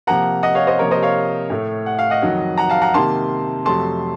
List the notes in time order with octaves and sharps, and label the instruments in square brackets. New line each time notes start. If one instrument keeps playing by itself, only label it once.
[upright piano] C3 F3 A#3 F#5 A#5
D#5 F#5
C#5 F5
C5 D#5
C3 F3 A#3 A#4 C#5
C5 D#5
C#5 F5
A2 A3
F#5
F5
D#5 F#5
F2 D#3 F#3
F#5 A#5
F5 A5
F#5 A#5
C3 D#3 A#3 A5 C6
F2 C3 F#3 A3 A5 C6